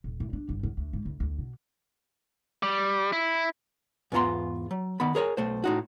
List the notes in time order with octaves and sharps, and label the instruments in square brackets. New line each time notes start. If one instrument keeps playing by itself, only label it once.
[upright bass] D#1
A2
D4
G1
E2
D2
G#2
D2
D2
B2
[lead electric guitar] G3
E4
[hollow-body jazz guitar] E2 G#2 B3 F4 A#5 C6
F#3
D#3 B3 B5
G#4 A#4 C#5 G#5
B1 A3 C5
A2 D#4 F#4